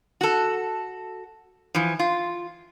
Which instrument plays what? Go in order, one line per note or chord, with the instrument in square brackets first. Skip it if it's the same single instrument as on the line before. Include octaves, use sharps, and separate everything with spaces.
[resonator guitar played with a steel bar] F#4 A4
E3 F3
F4